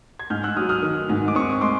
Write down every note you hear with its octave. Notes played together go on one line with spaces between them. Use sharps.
G#6
G#2 F6 G6
E6 F#6
F#3 D#6 F6
D#6 F6
D#3
G#2
D6
C4 C#6 D#6
G#3 C6 D6